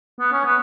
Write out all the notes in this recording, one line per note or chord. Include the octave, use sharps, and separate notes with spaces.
B3
C#4
B3